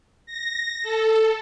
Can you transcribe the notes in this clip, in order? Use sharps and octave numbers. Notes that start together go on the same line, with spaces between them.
A#6
A4